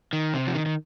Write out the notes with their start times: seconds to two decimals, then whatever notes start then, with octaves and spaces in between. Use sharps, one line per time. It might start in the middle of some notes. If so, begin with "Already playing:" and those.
0.13 D#3
0.34 C3
0.47 F3
0.54 D#3
0.66 D#3